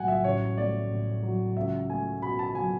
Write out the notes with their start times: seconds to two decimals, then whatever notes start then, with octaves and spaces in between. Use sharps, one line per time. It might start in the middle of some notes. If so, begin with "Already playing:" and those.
Already playing: B1 A2 F#3 F#5 G#5
0.08 E5
0.24 A1 C#5
0.57 A3 D5
0.91 A2
1.23 F#3
1.56 C#2 E5
1.89 A3 G#5
2.22 B2 B5
2.39 A5
2.55 F#3 G#5